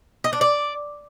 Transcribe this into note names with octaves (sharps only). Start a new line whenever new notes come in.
D#5
D4
D5